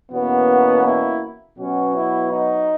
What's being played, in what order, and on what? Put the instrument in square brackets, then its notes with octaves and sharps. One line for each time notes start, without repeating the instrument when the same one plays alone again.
[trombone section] E2 B2 A#3 C#4 F#4 [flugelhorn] B3
[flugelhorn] E4
[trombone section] B2 F#3 B3 F#4 [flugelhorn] C#4
[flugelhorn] E4
D#4